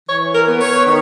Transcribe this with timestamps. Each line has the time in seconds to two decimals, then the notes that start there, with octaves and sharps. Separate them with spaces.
0.09 E3 C#5
0.34 A#4
0.47 B3
0.60 C#5
0.85 D#3